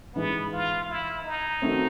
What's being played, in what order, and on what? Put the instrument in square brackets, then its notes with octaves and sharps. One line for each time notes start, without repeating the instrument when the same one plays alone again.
[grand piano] G#2 E3 G#3 [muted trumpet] B3
[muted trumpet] F4
E4
D#4
[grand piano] D#3 F#3 A3 C4